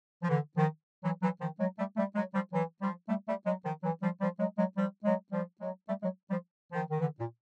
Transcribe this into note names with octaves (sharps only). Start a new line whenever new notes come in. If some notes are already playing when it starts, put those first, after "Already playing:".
F3
D3 E3
D#3 F3
E3 F#3
E3 F#3
D#3 F3
F#3 G#3
G3 A3
G3 A3
F#3 G#3
F3 G3
E3 F#3
F3 G3
G3 A3
G3 A3
F#3 G#3
D#3 F3
E3 F#3
F3 G3
F3 G3
F#3 G#3
F#3 G#3
F3 G3
F#3 G#3
F3 G3
F#3 G#3
G3 A3
F#3 G#3
F3 G3
D#3 F3
D#3
D3 E3
A#2